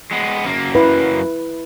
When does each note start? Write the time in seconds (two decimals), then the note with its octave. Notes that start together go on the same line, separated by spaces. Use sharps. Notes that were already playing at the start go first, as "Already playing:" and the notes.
0.11 G#3 B3
0.45 F#2 A#3
0.75 E4 B4